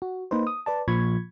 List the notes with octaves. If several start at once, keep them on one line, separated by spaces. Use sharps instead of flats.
F#4
A#3 D#4 B4 C5
D#6
B4 D5 A5
A#2 F3 B5 C#6 G#6